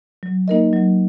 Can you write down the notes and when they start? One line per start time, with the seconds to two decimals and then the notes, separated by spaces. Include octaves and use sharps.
0.23 F#3
0.48 A#3 D#4 A#4 D#5
0.73 F#3